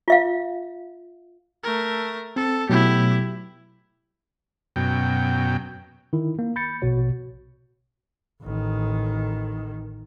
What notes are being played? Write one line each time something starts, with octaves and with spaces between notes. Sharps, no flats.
F4 E5 F5
A3 A#4
C4 A4
B2 F#3 A3 E4 G4
F#2 B2 G5
D#3 E4
A#3
B5 G6 A6 C#7
A#1 B2 F#4 C#5
A1 D#3